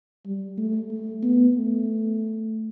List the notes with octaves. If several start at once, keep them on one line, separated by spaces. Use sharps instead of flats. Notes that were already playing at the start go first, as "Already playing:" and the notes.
G3
A3
A3
B3
A3